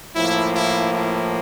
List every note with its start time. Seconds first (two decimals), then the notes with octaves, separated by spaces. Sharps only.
0.15 A2 F3 A#3 E4
0.54 E4
0.94 E4